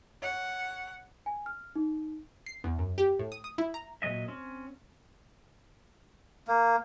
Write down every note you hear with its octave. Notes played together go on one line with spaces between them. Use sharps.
C#5 F#5
G#5
F6
D#4
C7
E2
F#2
G4
A2
D#6
D#6
E4
A#5
A#2 F#3 G3 D#5 E5
C4 C#4
A#3